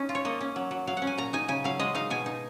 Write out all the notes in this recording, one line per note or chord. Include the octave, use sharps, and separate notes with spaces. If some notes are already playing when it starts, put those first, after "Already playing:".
Already playing: C#4 D#4
F4
C#5
A#3 D#5
C#4
F#3
F#3
F#3 F5
F#5
C#4
G#5
A#2 A#5
D#4 G#5
C#3 G#5
F#3 F5
G#3 D#5
D#4 F5
B2 G#5
D#4